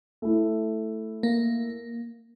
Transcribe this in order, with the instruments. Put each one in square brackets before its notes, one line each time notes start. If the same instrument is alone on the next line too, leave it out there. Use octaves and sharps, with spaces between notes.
[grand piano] A3 E4
[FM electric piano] A#3